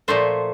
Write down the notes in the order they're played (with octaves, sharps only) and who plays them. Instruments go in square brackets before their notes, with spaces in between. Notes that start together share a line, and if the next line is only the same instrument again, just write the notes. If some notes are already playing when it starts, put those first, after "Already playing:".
[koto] A#2 F3 A3 C5